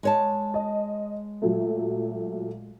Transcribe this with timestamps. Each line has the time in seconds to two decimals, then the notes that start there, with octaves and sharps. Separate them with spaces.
0.03 G#3 C#5 A5
0.54 D#5
1.42 A#2 F#3 A3